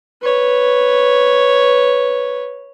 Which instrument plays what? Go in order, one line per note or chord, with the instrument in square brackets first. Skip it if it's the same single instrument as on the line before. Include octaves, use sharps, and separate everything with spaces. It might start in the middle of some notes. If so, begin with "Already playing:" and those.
[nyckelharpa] B4 C#5